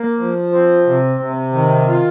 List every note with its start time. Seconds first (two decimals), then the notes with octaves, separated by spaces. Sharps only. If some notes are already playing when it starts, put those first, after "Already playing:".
Already playing: A#3
0.18 F3
0.52 C4
0.86 C3
1.20 C3
1.53 D#3
1.87 F4